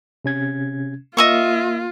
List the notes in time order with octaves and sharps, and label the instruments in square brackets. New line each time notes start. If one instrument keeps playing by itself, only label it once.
[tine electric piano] C3 C#4 G#6
[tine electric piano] A#3 [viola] F4 [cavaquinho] D#5 E5 C#6